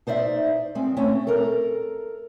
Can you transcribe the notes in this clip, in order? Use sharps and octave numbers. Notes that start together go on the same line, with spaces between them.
D#4 C5 D5 E5
F3 G#3 C4
A3 C4 C#4
A4 A#4